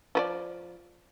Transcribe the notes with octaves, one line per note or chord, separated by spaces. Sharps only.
F3 B4 D5